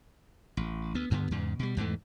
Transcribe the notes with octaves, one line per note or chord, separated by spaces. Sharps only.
A1
D2 B3
D2 G2 D3 B3
E2 G#2 C#3
B2 G3
E2 G#2 E3 A3